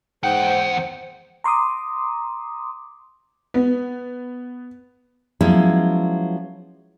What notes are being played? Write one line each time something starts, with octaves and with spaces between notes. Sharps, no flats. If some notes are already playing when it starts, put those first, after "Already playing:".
E2 G#2 C5 F#5 G5
A#5 C6 D6 D#6
B3
F3 F#3 G#3 B3 C#4 E4